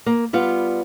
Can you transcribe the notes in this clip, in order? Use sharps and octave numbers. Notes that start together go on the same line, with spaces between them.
A#3
G3 B3 F4